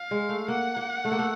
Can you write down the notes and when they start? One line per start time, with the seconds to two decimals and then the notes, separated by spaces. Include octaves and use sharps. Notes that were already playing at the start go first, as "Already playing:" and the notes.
Already playing: F5
0.11 G#3
0.29 A3
0.48 A#3 F#5
0.77 A#3
1.05 A3
1.11 A#3
1.19 A3